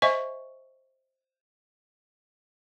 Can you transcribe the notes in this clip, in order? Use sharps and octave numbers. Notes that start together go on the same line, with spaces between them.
C5 D#5 E5 G#5 C#6